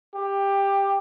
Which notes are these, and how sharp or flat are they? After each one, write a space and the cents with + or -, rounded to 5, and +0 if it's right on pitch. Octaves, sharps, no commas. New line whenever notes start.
G4 +15